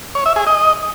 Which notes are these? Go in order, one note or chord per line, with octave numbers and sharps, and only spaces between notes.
C#5
E5
G#4
D#5